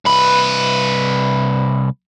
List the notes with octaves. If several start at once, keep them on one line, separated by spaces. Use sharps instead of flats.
C2 B4